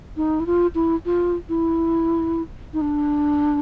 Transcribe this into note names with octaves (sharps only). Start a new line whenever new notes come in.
D#4
E4
F4
E4
F4
E4
D#4
D4